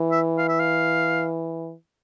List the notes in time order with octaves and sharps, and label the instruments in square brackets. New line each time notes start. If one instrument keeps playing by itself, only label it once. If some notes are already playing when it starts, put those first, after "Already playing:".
Already playing: [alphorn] E3
[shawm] E5
F5
E5
F5